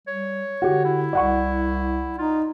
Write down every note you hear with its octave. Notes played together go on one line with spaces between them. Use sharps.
G3 C#5
D3 F#4 G4
E4
C2 D5 F#5 C#6
D#4 F4